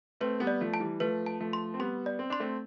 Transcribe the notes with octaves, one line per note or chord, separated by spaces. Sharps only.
A3 C4 B4
G3 B3
D5
F3 A3
A5
E3 G3
F3 A3 B4
A5
F3 A3
C6
C4
G3 B3 C6
D5
C4
D4 C6
A3 C4